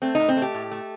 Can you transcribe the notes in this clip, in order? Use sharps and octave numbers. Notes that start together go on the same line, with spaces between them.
A3 C4
A2 D#4
C4
A3
G4
A2
A3